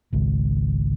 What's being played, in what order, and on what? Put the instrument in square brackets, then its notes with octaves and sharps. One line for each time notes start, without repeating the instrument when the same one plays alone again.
[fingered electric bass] G#1 C#2